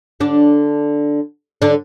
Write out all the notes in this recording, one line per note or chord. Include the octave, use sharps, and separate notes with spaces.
D3 D4
D3 D4